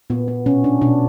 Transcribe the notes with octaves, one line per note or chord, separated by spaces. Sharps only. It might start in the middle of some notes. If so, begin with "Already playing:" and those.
A#2 B3
B3
B2 C#4
D4
B2 D4